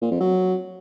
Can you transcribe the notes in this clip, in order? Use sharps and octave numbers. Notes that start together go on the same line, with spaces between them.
A#2
F2
F#3